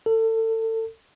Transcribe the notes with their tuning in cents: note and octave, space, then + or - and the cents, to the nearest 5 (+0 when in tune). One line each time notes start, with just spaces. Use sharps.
A4 +30